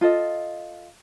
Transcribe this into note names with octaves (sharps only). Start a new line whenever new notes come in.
F4 A4 D#5